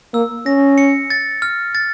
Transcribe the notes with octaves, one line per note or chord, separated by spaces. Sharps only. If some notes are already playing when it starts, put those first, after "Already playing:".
A#3 E6
C#4 A#6
C#7
A6
F6
A6